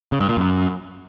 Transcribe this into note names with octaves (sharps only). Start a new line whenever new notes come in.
C#3
G2
A#2
F#2